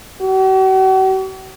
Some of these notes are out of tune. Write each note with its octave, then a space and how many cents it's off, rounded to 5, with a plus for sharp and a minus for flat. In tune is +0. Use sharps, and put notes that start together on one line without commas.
F#4 +45